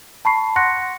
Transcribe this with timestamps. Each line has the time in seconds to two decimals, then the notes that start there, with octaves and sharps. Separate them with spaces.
0.25 A5 B5 C#6 C7
0.56 F#5 C6 C#6 F#6 A#6 C#7